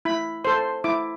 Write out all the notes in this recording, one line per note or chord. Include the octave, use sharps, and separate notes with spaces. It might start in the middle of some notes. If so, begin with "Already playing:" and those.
E4 B5
A4 C5 C6
E4 D6